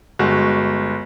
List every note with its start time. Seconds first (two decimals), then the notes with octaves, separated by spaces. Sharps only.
0.19 G1 G#3 F#4